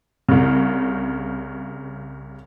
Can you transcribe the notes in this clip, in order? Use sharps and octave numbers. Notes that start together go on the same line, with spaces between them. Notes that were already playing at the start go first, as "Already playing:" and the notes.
C2 C#3